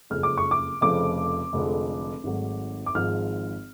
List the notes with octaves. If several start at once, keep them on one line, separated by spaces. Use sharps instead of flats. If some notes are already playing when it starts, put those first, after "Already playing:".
F#1 F2 C#3 G#3 F6
D6
C#6
D6
F1 F2 C#3 F3 A3 D6
F1 F2 D3 G#3
G#1 G#2 F#3 A3
D6
G#1 G#2 F3 G#3 F6